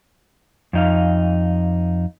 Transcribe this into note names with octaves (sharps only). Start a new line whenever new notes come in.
F2 D#4 F5